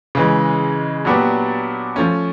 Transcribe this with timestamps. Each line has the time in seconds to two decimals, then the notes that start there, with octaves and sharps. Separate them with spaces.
0.15 C#3 E3 G#3
1.05 A#2 F#3 B3 D4 G4
1.96 F3 A3 C#4